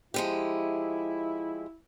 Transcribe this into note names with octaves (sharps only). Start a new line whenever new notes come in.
F3 G#3 E4 G4